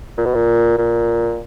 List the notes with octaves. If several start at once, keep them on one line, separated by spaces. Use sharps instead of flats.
A#2
B2
A#2
A#2